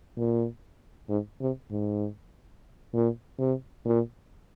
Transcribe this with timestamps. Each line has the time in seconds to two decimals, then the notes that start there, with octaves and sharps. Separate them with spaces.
0.17 A#2
1.09 G#2
1.41 C3
1.71 G#2
2.94 A#2
3.38 C3
3.85 A#2